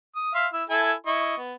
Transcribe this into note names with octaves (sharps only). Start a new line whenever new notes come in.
D#6
E5 F5 C6
E4 E6
E4 A4 G#5
E4 D#5 C#6
B3